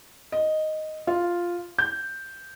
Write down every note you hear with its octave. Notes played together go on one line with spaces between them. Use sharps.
D#5
F4
G6